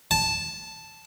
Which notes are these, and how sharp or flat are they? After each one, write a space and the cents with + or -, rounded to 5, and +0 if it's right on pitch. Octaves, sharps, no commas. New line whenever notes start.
A5 -5